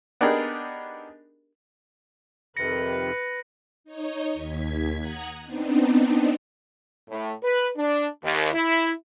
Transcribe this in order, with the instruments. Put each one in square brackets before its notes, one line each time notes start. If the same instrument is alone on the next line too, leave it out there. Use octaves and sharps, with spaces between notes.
[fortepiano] B3 D4 D#4 G4 G#4 A#4
[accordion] F2 C3 D#3 [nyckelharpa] B4 [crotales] A#6 C#7
[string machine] D#4 C#5 D#5
D#2 G#6 B6
F#5 A#5 D#6 F#6 G#6
B3 C4 D4 D#4
[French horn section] A2
B4
D4
D#2
E4